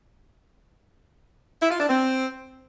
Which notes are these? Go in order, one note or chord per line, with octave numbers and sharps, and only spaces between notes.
E4
F4
D4
C4